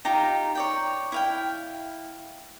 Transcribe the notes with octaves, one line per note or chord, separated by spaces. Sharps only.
D#4 F4 G4 A#5
C#5 D5 G5
E4 F5 G5